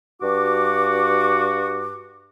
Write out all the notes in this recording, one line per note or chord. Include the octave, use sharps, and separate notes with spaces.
G2 F#4 D6